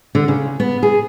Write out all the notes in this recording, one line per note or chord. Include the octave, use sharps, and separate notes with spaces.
D3
C#3
B3
G#4